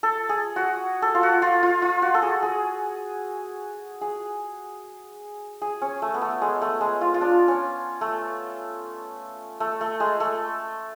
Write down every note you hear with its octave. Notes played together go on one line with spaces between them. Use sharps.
A4
G#4
F#4
A4
F4
F#4
F4
F4
F4
F#4
A4
G#4
G#4
G#4
G#4
C#4
A3
B3
A3
G#3
A3
G#3
F4
F4
D4
C#4
A3
A3
A3
G#3
A3